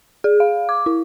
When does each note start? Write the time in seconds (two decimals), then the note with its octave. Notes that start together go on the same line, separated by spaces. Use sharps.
0.24 G#4
0.40 F5
0.69 D6
0.86 E4